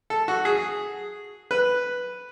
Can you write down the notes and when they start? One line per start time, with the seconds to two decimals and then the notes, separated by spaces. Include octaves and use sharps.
0.10 A4
0.28 F#4
0.45 G#4
1.51 B4